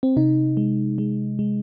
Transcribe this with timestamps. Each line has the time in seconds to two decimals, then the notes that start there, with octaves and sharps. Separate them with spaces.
0.03 C4
0.16 C3 D#4
0.57 G#3
0.98 G#3
1.39 G#3